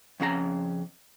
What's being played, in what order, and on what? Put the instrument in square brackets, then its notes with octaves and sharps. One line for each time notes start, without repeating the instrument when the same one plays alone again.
[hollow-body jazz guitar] F2 C#3 F#4 A#5